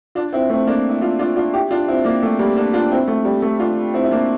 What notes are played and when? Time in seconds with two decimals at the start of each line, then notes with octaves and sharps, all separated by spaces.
0.15 D4 F4
0.33 C4 E4
0.50 A3 C4
0.67 A#3 D4
0.90 E4
1.02 D4 F4
1.19 D4 F4
1.36 D4 F4
1.54 E4 G4
1.71 D4 F4
1.88 C4 E4
2.05 A#3 D4
2.23 A3
2.39 G3 A#3
2.57 A#3 D4
2.74 D4 F4
2.91 C4 E4
3.08 A3
3.25 G3
3.42 A3
3.60 D4 F4
3.94 C4 E4
4.04 E4
4.11 A#3 D4